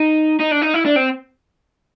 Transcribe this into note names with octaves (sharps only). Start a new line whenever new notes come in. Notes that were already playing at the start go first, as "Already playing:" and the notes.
Already playing: D#4
D#4
D4
D#4
E4
D4
C4